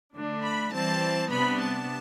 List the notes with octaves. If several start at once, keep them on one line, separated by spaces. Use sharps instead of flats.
D3 A3 D4
B5
E3 G3 C4 A5
C3 G3 B3 D4 B5
A5